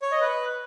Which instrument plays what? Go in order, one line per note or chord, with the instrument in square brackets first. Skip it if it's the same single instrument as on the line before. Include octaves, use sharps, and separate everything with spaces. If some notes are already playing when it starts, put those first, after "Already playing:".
[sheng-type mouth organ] C#5
D#5
B4